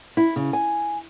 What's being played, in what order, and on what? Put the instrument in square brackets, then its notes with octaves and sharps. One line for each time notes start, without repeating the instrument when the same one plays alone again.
[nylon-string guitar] E4
C#3
G#5